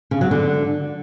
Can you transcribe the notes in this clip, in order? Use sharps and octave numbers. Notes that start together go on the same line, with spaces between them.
C#3
F#3
D3